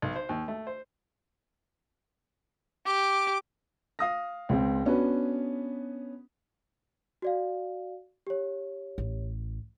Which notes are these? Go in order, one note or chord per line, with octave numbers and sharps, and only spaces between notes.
B1
C5
D#2
A3
C5
G4 D6
F5 D#6 A#6
C#2 C4
B3 C#4 D4 F#4 B4
F#4 D5 F5
G4 C#5
A1